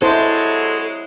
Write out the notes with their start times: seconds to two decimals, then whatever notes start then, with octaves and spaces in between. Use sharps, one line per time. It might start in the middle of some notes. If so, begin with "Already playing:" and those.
0.02 C3 F#3 G#3 E4 A4 C5